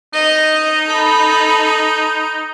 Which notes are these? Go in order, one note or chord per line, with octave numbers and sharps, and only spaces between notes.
D#4 D#5
A4 B5